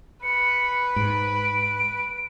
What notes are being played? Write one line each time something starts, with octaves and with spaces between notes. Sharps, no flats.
B4 C#7
G#2 D7